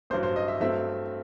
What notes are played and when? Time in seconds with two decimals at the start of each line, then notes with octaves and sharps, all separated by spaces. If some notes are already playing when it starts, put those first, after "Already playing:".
0.10 A1 G2 F#3 C5
0.23 C5
0.36 D#5
0.48 E5
0.60 G2 F#3 A3 C4 E5